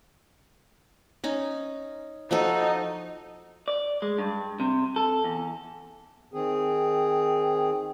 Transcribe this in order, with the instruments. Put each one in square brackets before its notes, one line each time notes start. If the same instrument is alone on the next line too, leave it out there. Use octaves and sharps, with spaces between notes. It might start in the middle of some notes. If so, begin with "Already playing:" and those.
[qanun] C#4 D#4
[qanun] F3 F#4 A4 [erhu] D#4
[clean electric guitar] D5
G#3
G2
C3
A4
E2
[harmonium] D#3 C4 G#4